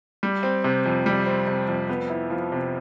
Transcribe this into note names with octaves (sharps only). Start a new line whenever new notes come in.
G3
C4
C3
F2
G3
C4
C3
F2
B3
E4
F3
C3